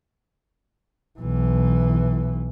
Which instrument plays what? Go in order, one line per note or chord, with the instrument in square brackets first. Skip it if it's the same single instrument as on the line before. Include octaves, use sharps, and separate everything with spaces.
[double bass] B1 E3